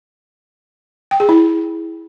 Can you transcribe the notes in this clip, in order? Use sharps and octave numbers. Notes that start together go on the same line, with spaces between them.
G5
G#4
E4